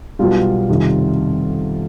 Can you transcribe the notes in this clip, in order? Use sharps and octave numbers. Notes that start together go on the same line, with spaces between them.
B1 B2 G3 F4
F2 C3 D#3 G3